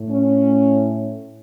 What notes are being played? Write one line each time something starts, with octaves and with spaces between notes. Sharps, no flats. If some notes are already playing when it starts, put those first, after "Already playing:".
Already playing: A2
C#4